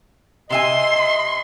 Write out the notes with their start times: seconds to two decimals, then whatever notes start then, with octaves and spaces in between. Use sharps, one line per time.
0.50 C3 D#5 E5 G#5 C6